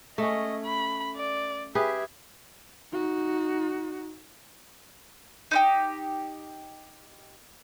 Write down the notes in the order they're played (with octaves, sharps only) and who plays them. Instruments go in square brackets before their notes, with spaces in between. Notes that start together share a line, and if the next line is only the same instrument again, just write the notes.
[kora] A3 C#4 [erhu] D#5
[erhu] B5
D5
[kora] G4 G#4 B4 [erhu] E5
[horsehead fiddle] D#4 F#4
[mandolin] D#4 E4 G4